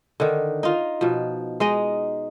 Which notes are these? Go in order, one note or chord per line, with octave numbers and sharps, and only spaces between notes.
D3 D#3
D#4 F4
B2 F3
G#3 D#4 D#5